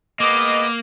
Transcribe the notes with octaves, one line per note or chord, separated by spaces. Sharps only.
G#3 A#3 B3 D#5 D6